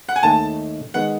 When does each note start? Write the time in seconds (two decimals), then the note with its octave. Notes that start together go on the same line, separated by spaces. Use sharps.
0.09 F#5
0.16 G#5
0.23 D#2 D#3 A3 A5
0.94 D#3 G#3 B3 F#5